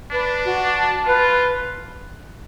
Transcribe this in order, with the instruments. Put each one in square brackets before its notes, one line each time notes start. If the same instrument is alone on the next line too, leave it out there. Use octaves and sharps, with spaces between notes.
[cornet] D4 [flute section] B4
[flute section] F#4
A5
[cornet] F4 [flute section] B4